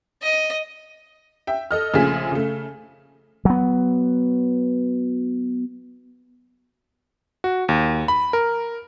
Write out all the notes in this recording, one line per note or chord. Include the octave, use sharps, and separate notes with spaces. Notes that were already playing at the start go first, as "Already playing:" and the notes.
D#5
E5 G5
A4 D#5 F6
A#1 C#3 A3 F4 G#4 B6
C#3 A3
F#3 B3
F#4
D#2
B5
A#4